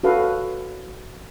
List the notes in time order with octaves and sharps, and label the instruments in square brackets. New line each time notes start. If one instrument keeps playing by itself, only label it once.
[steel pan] F#4 A4 B4 F5